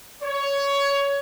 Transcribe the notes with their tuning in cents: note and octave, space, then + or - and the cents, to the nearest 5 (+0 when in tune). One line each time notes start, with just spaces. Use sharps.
C#5 +15